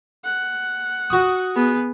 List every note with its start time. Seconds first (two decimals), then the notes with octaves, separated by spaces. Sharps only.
0.24 F#5
1.10 F#4 D#6
1.55 B3 G#4